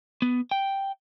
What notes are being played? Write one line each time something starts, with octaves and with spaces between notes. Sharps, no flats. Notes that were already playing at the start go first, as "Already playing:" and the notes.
B3
G5